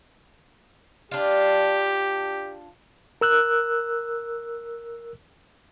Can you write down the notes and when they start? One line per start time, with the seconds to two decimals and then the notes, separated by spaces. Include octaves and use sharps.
1.11 D4 F4 G4
3.21 A#4 E6 F#6